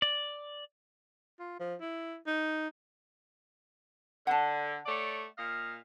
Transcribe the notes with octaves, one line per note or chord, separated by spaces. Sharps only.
D5
F4
F3
E4
D#4
D3 F#5 A5
A3 C#5 D5
A#2 D#5 F5